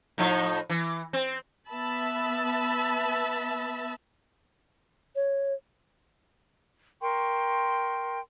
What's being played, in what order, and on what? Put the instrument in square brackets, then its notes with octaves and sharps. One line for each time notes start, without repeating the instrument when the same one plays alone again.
[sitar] A2 F3 D#4
E3
C4
[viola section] B3 E5 A5 B5
[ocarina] C#5
[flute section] A#4 C6 C#6 [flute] G5